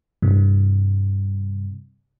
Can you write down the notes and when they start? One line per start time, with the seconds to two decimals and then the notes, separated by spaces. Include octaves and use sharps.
0.22 G2 C3